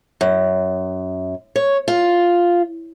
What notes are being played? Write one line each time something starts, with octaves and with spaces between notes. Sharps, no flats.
F#2
C#5
F4